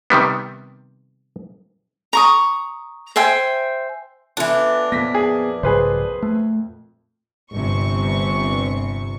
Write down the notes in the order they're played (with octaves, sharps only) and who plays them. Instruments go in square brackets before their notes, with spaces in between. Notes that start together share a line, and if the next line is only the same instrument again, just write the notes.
[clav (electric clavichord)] C3 D#3 G3 B3
[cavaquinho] A#5 C#6 D#6
C5 E5 G5 G#5
[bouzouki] E3 D4 [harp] B3 F4 A4
[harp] F2 A#2 [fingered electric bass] B3 [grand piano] A#6 B6
[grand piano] G#4
[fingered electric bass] B1 G#2 C#3 [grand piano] G#4 B4 C5
[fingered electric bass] A3
[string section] G1 G2 C3 C#6